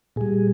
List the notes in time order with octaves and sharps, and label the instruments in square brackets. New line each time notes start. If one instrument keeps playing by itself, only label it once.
[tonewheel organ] A#2 G3 G#4